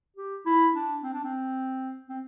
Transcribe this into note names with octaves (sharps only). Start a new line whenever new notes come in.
G4
E4
D4
C4
D4
C4
C4